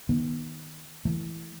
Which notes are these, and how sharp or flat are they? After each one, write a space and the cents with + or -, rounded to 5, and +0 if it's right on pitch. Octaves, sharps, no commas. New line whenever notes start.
D#3 +5 B3 -35
E3 +0 A3 +0